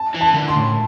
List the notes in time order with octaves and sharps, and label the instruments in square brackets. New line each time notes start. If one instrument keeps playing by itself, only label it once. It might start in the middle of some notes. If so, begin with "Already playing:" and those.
Already playing: [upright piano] A5
[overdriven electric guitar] E3
[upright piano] A5
[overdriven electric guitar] D3
[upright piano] C6
[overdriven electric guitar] A2